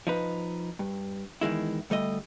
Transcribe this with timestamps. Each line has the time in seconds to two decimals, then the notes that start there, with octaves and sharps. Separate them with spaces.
0.07 F3 D#4 B4
0.79 G2
1.41 E2 D#3 G#3 E4
1.90 D2 G3 A3 D#5